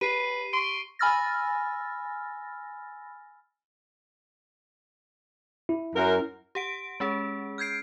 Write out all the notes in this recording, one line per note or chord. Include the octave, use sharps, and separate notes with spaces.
G4 B4 C7 D#7
C6 C#6 D7
G#5 B5 E6 F6 A6 A#6
E4
F#2 A#4
G4 F#5 D7
G#3 C#4 G#4
F6 G6 G#6 C7 D7